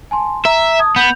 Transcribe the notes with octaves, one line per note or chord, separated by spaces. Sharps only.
G#5 A5 C6
E5 A#5
A5 D#6 G#6
B3 G6 F7